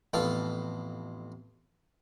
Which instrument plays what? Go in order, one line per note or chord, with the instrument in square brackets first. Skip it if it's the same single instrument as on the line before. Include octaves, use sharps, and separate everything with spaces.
[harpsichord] A1 F2 B3 A4 F5